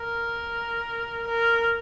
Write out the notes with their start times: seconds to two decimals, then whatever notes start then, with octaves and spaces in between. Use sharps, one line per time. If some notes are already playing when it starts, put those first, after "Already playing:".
Already playing: A#4
1.28 A#4